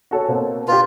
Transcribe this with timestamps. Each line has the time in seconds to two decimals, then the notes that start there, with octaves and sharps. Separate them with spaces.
0.11 F#4 A4 C#5
0.28 B2 A#3 C4
0.68 F4 G4 B4